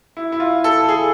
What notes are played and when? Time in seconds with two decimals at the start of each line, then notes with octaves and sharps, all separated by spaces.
0.17 E4
0.32 E4
0.40 F4
0.64 A4
0.89 G#4